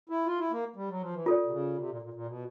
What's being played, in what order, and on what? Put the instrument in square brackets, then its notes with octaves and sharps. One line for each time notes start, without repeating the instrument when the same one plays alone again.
[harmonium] E4
F4
E4
A#3
G3
F#3
F3
E3
[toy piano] F4 A4 D5
[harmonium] C3
C#3
C3
A#2
A#2
A#2
B2